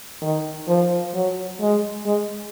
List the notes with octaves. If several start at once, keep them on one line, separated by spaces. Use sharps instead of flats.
D#3
F3
F#3
G#3
G#3